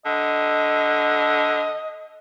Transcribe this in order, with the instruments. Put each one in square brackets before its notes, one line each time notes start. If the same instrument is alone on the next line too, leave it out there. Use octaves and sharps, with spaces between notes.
[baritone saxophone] D3 [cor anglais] D#5